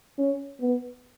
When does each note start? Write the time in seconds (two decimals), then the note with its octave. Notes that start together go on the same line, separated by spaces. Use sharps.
0.18 C#4
0.61 B3